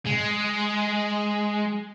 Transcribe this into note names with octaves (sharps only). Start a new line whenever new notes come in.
G#3